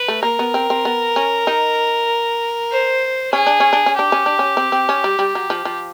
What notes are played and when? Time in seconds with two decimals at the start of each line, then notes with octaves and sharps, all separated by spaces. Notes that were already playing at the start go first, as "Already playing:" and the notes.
Already playing: B4
0.08 A3
0.23 A#3 A#4
0.39 B3
0.54 C4
0.70 C4
0.85 B3
1.16 C#4
1.47 D#4
2.71 C5
3.33 C#4 G#4
3.47 D4
3.60 C#4
3.73 D4
3.86 C#4
3.96 D4 G4
4.12 C#4
4.26 D4
4.39 C#4
4.57 C4
4.72 C4
4.89 C#4
5.04 G3
5.19 G3
5.35 F#3
5.50 F3
5.65 F3